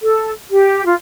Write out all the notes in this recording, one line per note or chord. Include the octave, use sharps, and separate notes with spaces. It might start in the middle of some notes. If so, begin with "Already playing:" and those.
A4
G4
F4